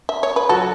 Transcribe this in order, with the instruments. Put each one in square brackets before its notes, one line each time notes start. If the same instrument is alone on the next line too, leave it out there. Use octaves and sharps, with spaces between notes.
[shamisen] E5
C#5
B4
[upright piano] F#3 F#4 [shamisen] A4